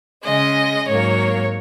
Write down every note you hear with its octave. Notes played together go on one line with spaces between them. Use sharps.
C#3 G#3 D#5
G#2 F#3 A#3 C#5